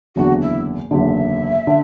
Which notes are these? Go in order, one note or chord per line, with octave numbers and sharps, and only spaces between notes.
F#1 E2 D3 F#4
E4
F#1 E2 D3 E5
D3